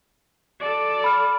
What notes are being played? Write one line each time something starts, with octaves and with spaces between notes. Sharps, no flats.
A4 D5
B5 F6